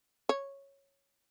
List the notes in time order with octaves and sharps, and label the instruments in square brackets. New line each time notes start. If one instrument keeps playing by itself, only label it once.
[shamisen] C#5